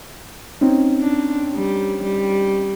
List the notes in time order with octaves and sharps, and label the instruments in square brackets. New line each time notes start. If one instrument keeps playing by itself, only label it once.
[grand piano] C4 C#4 D#4
[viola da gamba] D4
G3
G3